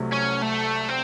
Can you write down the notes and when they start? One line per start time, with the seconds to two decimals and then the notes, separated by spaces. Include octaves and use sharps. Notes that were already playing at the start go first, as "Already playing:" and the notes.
Already playing: C2 C3 F#3 A3
0.12 C#4
0.42 A3
0.89 C4